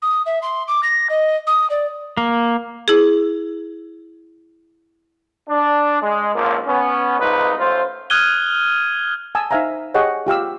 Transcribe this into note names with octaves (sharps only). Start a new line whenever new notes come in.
D#6
E5
C6
D6
A#6
D#5
D#6
D5
A#3
E4 G#4
D4
G#3
G#1 C#2 F3 A#3
B3 C#4
C2 G#2 D#4 F4 B4
A1 A3 F4 C5
D#6 F6 F#6 G#6 D#7 G7
G#5 A5 D#6 E6
D#4 C5 E5 F5 G#5 A#5
G4 G#4 C#5 D#5 F#5 G5
F4 G4 F5 E6